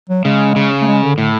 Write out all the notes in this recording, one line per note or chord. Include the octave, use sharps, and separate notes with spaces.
F#3
C#3 G#3
C#3
A3
G#3
D3
A2 D3